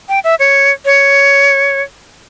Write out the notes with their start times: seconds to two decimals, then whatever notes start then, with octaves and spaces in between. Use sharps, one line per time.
0.09 G5
0.24 E5
0.39 C#5
0.85 C#5